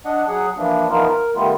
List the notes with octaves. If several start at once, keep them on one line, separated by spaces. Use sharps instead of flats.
D4 D#5 F#5
F#3 G#4 F#5
E3 F3 A#3 D4
E3 F3 B3 D#4 F4 A#4
A#4
D#3 G3 A3 B3 F4